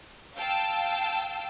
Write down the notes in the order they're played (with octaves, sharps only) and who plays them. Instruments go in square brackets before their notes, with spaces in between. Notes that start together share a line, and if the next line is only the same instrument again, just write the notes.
[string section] F5 G5 A5 E6